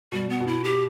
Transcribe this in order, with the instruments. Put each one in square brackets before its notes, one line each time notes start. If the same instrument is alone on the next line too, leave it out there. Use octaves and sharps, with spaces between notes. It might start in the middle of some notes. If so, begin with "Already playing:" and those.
[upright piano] B2 [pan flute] G3
[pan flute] B3
[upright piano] B2
[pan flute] E4
G4